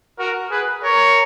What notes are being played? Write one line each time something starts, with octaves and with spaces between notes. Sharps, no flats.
F#4 A#4
G#4 B4
A#4 C#5